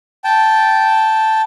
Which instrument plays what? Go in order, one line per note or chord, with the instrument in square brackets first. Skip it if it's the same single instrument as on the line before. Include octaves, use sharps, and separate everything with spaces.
[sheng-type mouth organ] G5 A5